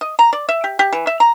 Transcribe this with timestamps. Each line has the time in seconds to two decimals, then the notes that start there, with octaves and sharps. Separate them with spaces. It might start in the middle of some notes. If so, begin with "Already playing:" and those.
0.01 D#5
0.19 A#5
0.33 D5
0.49 E5
0.64 G4
0.79 G4
0.93 E3
1.07 E5
1.20 A#5